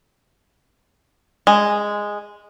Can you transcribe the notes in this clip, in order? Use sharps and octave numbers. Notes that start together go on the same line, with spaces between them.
G#3